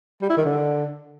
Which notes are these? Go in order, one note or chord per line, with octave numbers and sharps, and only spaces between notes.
G3
E4
D#3
D3